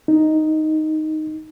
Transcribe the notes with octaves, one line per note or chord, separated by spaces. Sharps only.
D#4